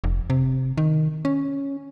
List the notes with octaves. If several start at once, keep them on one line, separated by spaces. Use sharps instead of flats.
F1
C3
D#3
C#4